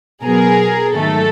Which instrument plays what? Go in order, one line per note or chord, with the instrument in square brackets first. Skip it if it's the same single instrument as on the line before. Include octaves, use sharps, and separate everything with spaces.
[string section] B2 F#3 B3 G#4 A#4
G#2 D#3 F#3 A3 A4